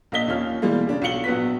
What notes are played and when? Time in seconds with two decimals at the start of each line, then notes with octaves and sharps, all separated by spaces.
0.12 A#1 A#3 D#5 B6 G7
0.28 D#2 F3 A#3 C#4 F6
0.62 B2 E3 G3 G#3 A#3
0.87 C#3 D4 G4
1.02 B1 F#3 F4 C#7 F#7 G7
1.24 A#1 F#3 B3 F#4 B4 B6